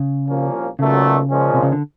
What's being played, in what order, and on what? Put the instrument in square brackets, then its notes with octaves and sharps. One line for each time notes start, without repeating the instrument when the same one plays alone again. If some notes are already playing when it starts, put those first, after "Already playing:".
Already playing: [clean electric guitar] C#3
[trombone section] C2 A#2 F3 A#3 C#4
[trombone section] B1 A#2 F#3 A3 [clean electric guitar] C#3
[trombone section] A#2 F3 G#3 C#4
[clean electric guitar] C3
C#3
D3